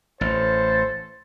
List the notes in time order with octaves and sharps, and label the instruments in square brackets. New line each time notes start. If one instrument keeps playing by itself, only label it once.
[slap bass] A1 [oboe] A4 [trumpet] C5